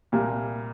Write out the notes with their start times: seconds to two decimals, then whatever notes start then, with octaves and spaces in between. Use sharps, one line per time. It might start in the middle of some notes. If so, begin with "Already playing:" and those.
0.12 C2 A#2 G3 A#3